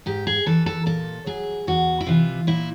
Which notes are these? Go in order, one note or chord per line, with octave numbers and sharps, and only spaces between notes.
G#2 G4
G#4
E3 A4
A4
A#2 A4
F#3 G#4
E2 F#4
E4
C3 E3 F4
A#2 E4